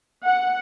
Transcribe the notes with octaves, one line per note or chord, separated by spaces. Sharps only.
F#5